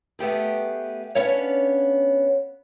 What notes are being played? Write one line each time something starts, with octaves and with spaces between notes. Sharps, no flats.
A3 B3 G4 G#4
B3 C#4 D4 C#5 F5